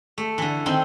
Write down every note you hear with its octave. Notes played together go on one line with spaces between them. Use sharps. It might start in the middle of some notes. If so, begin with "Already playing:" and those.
A3
D3 E3
D#3 C4 D#4